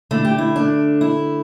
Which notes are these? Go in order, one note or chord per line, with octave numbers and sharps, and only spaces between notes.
D3 A3 E4
G4
E4
D4
E4